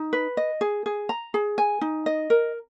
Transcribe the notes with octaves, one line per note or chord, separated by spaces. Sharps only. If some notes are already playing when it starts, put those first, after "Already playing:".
Already playing: D#4
B4
D#5
G#4
G#4
A#5
G#4
G#5
D#4
D#5
A#4